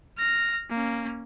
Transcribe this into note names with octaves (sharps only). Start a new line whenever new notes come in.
F6 A#6
A#3 C#4